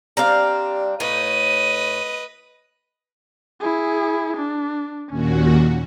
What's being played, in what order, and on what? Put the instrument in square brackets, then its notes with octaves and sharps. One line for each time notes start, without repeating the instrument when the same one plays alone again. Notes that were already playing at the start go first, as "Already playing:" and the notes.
[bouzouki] G3 C4 D4 [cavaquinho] F5 A#5
[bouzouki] A2 [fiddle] B4 D#5 [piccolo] D#7
[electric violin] E4 G#4
D4
[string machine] D#2 A#2 F#4 [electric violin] C#4